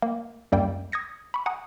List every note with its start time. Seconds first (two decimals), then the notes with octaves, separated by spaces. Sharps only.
0.02 A#3
0.52 C#2 F#2 G3 A#3 G5
0.92 D#6 G#6 A#6 C#7
1.34 B5 C#6
1.46 F#5 G#5 A#5 D#6